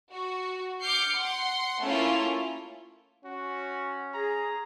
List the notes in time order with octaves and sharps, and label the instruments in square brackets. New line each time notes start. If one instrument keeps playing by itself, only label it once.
[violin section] F#4
D6 F6 G6 C7 C#7
F#5 C6
A3 A#3 C#4 E4 F4
[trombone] C#4 [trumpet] F#4
[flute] G#4 [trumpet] A#5